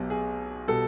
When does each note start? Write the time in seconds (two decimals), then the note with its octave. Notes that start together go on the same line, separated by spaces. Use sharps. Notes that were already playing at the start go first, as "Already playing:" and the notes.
Already playing: B1 B2 F#3 B3 G4
0.10 G#4
0.68 B2 G3 A4